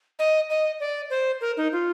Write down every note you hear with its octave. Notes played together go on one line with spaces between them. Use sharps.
D#5
D#5
D5
C5
A#4
D#4
F4